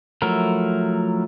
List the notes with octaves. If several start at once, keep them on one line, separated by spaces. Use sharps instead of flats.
F3 F#3 A3 E4 A#4